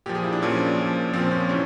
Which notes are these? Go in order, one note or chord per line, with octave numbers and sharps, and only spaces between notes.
A#2 F3 G4
G#4
E4
D4
A#2 F3 C#4
A#2 F3
A#2 F3 C4
C#4
C3 E3 C#4